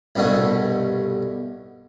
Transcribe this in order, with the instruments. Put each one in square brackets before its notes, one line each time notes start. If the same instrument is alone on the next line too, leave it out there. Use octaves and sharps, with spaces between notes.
[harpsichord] C2 G2 B2 D3 A3